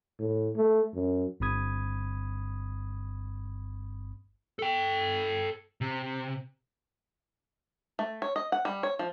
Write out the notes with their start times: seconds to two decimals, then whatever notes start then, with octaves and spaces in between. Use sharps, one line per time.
0.19 A2
0.56 A3
0.94 F#2
1.40 G1 G2 C4 B5 D#6 G#6
4.59 A4 G5
5.81 C3
7.99 A3
8.22 C#5
8.36 D#5
8.52 F#5
8.65 G3
8.83 C#5
8.99 F3